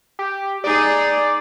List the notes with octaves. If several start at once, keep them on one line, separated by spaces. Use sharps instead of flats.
G4
D#4 G#4 D5